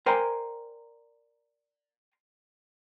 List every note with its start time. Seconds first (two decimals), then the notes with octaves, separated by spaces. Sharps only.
0.06 A#4 C5 D5 G5 G#5 A#5